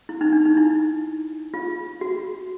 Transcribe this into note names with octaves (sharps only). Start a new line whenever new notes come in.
E4
D#4
D4
D#4
E4
F4
F#4